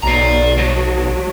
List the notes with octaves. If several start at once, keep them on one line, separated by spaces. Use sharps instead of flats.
B1 D5 A#5
F3 F#3